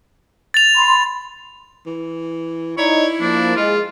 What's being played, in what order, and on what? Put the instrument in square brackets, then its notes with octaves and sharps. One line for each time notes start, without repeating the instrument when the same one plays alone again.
[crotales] A6 F7
[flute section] B5 C6
[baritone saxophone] E3
[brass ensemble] D#4 D5 [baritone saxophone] E4 [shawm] C#5
[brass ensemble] F3 A#3 [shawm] D4
[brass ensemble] G#3 [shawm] F4